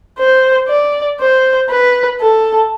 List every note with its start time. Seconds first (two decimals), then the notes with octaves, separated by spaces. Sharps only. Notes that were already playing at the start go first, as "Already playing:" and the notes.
0.19 C5
0.69 D5
1.20 C5
1.70 B4
2.20 A4